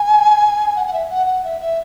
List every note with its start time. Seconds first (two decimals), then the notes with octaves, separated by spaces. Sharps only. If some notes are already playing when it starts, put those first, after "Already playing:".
Already playing: G#5
0.76 F#5
0.86 F#5
0.93 E5
1.09 F#5
1.26 F#5
1.44 E5
1.61 E5